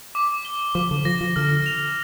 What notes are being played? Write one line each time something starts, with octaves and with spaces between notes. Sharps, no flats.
D6
G7
F3 D6
D3
F3 A#6
F3
D3 F6
F7